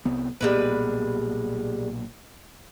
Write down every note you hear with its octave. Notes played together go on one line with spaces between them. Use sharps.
C2 B3
B1 A#2 G3 G#3 B3 B4